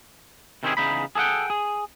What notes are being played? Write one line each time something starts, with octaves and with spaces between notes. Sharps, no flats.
C3 D#3 C4 C#4 E4 G#4
E2 C#3 D#4 B5
G#4 A4 D5 F#5 G5
G#4